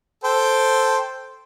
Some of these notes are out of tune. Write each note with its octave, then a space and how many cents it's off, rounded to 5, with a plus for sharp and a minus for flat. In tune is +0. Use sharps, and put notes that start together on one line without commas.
A4 +0 C5 +0 G5 +0